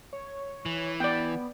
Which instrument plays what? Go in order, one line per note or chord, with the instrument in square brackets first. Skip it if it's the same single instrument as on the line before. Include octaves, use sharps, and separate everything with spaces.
[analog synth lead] C#5
[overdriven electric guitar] E3
[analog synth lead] B3 [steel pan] D5 G5